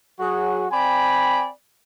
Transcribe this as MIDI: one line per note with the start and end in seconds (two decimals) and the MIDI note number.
0.20 0.65 54
0.20 0.65 66
0.20 0.65 68
0.71 1.49 60
0.71 1.49 74
0.71 1.49 79
0.71 1.49 80
0.71 1.49 83